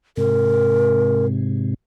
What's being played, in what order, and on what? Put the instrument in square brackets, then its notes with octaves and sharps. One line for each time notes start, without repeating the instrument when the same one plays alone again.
[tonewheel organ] G#2 C3 [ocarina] A#4